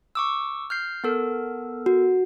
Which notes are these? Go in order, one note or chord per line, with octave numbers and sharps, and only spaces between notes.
C#6 D6 E6
F6 G6 C7
B3 A4 A#4
F#4